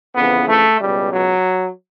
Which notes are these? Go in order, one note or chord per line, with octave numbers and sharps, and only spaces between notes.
F2 C#3 E3 B3
A3
C#2 B2 G3
F#3